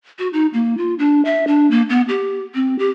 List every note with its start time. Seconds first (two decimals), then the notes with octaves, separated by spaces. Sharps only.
0.19 F#4
0.33 D#4
0.54 A#3
0.78 F4
0.99 D4
1.25 E5
1.47 D4
1.71 A#3
1.90 B3
2.09 G4
2.55 C4
2.79 G4